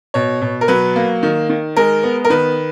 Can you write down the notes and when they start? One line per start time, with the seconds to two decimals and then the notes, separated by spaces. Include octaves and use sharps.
0.14 B2 C#5
0.42 B2
0.61 A#4
0.68 F#3 B4
0.96 A#3
1.23 D#3
1.49 D#3
1.76 G#3 A#4
2.03 B3
2.25 A#4
2.30 D#3 B4